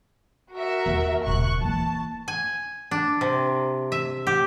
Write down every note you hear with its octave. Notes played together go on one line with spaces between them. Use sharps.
F#4 A#4 E5
D#2
D#1 C#3 C#6 F#6
E3 A#3 A5
G#5
D4
C3
E5
G4